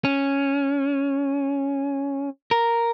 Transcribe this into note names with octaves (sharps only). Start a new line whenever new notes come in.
C#4
A#4